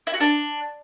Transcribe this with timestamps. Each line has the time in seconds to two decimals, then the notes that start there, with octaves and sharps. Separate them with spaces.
0.07 E4
0.14 F#4
0.20 D4